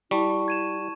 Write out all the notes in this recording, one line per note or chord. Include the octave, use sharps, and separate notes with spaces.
G3 E4 A5 C#6
G#6 D#7 E7